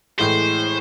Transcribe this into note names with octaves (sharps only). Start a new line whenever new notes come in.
A2 E3 G#3 C5